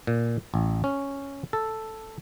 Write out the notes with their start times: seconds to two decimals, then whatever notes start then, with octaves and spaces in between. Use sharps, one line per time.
0.07 A#2
0.54 A1
0.84 C#4
1.53 A4